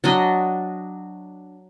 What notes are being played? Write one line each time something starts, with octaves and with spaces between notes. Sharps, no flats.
F#3 D4 D#5